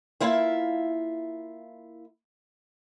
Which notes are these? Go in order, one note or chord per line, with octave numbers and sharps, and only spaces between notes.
A#3 E4 F4 E5